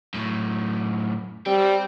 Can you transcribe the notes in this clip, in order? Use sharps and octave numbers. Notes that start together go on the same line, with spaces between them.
F#2 A2
G3 C4